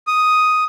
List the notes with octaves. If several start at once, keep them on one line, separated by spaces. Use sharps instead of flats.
D#6